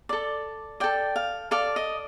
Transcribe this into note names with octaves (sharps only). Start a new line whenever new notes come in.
A4 D5
A4 D5 G5
F5
A4 D5 F5
D#5